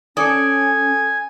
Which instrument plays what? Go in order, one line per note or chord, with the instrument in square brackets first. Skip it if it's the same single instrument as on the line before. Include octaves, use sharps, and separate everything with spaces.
[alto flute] C#4 [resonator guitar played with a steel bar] A4 D5 [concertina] G#5 [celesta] D#6 C#7